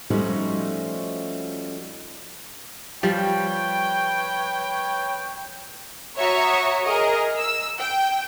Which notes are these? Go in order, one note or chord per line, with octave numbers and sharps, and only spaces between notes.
F3 G3 A3 C#4 D#4 F#4
F3 G3 B4 C#5 G5
F#4 C#5 E5 A#5 C#6 D#6
G#4 A#4 D#5
E6
G5